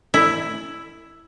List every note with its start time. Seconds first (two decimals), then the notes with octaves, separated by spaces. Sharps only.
0.14 E4